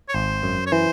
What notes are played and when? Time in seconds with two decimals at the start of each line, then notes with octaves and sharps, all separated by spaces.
0.09 C#5
0.14 G#1 C5
0.43 F#2
0.66 C#5
0.72 E3 C5